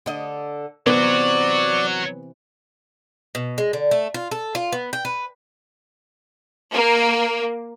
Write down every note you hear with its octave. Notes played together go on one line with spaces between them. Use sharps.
D3 D#5
C3 E3 F#3 B3 F#4 D5
B2
G#3
D3
A3
F4
A4
F4
B3
G5
B4
A#3